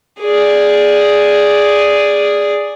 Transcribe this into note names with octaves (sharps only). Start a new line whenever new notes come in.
G#4 D5